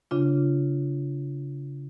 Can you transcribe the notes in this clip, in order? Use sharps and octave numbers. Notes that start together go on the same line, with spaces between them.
C#3 D4 F4